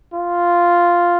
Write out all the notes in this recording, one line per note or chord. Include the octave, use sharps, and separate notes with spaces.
F4